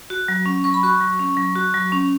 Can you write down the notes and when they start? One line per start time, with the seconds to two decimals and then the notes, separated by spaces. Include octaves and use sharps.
0.10 F#4
0.28 F#3
0.46 C#4
0.64 F#3 C#6
0.74 B5
0.83 F#4 C#6
1.01 F#3
1.19 C#4
1.37 F#3
1.56 F#4
1.74 F#3
1.92 C#4